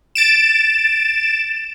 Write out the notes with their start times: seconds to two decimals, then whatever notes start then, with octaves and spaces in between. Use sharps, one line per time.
0.15 A6 D7 E7